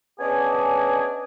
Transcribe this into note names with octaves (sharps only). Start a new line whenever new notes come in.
B3 C#4 D4 G#4 D#5 G#5